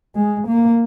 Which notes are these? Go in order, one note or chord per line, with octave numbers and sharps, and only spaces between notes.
G#3
A#3